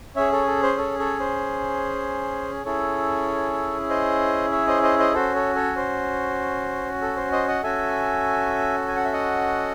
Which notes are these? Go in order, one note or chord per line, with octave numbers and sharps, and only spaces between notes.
C#4 G#4 C#5 E5
A4 C#5
A4
C5
A4 C#5
A4 C#5
C5
C#4 E4 G#4 A4 C#5
C5 D#5
C#5 E5
C5 D#5
C5 D#5
C5 D#5
C#4 F#4 A4 C5
A4 C#5
A4 C#5
C5
A4
C5
C5 D#5
D#5 F#5
C#4 F#4 A4 E5 G#5
G#5
F#5
E5
D#5 F#5